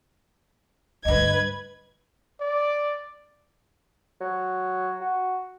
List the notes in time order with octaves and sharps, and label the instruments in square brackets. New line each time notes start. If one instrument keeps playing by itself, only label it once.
[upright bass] D2 G2 [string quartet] B4 G#6 [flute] D#5
[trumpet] D5
[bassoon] F#3
F#4